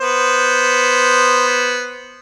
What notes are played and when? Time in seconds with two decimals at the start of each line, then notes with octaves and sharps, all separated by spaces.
0.01 B3 C5